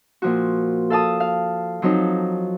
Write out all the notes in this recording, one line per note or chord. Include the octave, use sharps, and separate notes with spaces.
A#2 F3 F#4
A4 F5 A5 D#6
F5
F3 F#3 C4 D#4